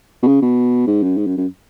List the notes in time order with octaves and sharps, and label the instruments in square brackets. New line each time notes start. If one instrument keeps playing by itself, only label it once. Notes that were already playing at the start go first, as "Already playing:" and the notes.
[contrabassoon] B2
C#3
B2
G#2
F#2
G#2
F#2
F#2